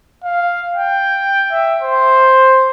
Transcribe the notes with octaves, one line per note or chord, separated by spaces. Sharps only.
F5
G5
E5
C5